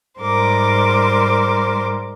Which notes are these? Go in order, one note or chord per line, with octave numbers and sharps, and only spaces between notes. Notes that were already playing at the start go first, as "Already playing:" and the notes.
G#2 G3 A#4 C5 D6